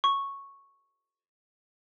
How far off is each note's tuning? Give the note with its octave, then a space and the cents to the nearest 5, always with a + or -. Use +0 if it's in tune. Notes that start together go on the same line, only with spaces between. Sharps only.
C#6 -5